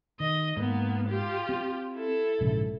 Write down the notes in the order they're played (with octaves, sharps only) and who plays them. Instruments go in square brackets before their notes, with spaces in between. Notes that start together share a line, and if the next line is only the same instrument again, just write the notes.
[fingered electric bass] D#3 [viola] D#5
[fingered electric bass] G#2 [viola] A#3 B3
[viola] F4 G4
[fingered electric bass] C4
[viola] E4 A4
[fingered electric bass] A#1 G#2 C#3